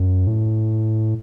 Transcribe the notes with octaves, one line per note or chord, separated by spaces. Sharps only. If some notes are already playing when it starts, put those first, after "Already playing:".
Already playing: F#2
A2